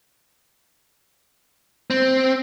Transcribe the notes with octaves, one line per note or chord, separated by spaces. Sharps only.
C4